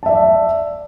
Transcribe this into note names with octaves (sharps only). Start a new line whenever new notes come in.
D5 E5 A5